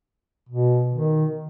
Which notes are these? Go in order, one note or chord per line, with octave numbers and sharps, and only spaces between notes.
B2
D#3